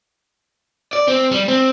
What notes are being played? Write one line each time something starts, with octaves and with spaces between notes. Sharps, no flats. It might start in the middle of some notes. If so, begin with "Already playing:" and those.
D5
C4
G3
C4